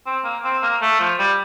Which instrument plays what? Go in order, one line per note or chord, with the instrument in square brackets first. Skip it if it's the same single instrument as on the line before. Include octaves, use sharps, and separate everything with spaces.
[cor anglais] C4
A#3
C4
A#3
A3
F3
G3